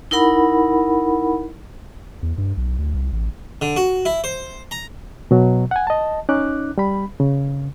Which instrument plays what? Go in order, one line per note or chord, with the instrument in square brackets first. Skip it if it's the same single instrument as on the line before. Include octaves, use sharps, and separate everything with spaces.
[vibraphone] D#4 E4 A#4 F#5 B5
[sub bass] E2
G2
B1
D2
C2
A1
[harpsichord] D3
F#4
E4
C5
A#5
[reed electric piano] B2 F#3
F#5 G#5
D#5 A5
C#4 D#4 D6 F#6
G3 B5
C#3